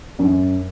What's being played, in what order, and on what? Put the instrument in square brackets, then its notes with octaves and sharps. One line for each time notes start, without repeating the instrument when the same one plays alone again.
[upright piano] F#2